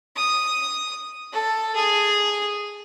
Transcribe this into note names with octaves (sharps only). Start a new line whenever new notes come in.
D#6
A4
G#4